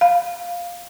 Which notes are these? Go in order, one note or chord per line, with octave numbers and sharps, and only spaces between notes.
F5